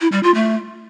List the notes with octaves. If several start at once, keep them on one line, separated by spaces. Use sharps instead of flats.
E4
G3
F4
A3